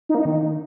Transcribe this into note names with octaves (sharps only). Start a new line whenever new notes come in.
D#4
A#3
D#4
D#3